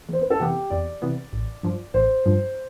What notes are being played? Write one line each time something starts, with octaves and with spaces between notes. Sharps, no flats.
E2 C5
B4
A4
C3 E3 B3 G4
E2 D5
C3 E3 B3
A1
G2 F3
A1 C5
G2 F3